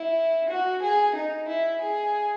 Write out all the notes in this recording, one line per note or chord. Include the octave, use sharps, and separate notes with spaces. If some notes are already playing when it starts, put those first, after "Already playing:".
Already playing: E4
F#4
G#4
D#4
E4
G#4